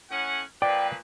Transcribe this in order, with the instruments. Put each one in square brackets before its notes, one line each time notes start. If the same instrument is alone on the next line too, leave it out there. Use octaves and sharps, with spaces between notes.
[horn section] A2 C#4 F#5
[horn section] A#2 F3 B4 [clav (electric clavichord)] D5 [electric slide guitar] G5